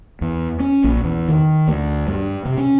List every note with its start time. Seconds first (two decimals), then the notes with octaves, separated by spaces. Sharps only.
0.21 E2
0.60 C#4
0.84 A#1
1.03 E2
1.28 D#3
1.67 D2
2.07 G2
2.45 C3
2.57 C#4